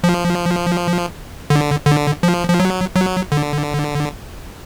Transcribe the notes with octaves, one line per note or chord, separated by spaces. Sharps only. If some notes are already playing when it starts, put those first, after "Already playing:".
F3
D3
D3
F3
F3
F#3
F#3
D3